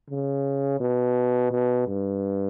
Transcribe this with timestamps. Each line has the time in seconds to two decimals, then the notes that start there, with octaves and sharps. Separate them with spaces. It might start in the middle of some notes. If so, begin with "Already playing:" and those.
0.10 C#3
0.80 B2
1.51 B2
1.87 G2